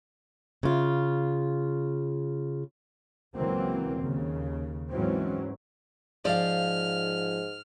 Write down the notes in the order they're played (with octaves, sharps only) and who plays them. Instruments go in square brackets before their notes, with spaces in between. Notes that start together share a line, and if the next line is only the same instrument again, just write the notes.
[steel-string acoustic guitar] C#3 F4
[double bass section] C#2 E3 F#3 A#3 C4
D#2 C#3
G#2 E3 F#3 C4 C#4
[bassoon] G#2 [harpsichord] F3 [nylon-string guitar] D5 F5 [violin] F6